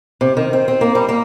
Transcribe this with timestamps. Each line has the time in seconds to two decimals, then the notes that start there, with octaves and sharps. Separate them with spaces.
0.21 C3
0.37 D#3
0.53 C4
0.68 C4
0.81 A#3
0.95 G3
1.09 A#3